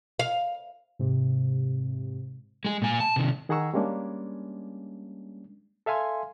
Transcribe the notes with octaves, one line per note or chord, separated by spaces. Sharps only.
F5
G#2 C3
G#3 G#4
A#2 G#5
A5
C3 D#3
D#3 G#4 F#5 A#5 C#6 E6
G3 G#3 A#3 C#4 D4
A4 E5 F5 G#5 C6